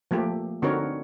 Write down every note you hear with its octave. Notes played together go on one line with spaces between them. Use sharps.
F3 A3 A#3 G4
D3 C4 D#4 F#4 A#4 C#5